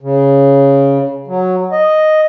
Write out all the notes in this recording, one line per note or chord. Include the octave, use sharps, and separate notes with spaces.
C#3
F#3
D#5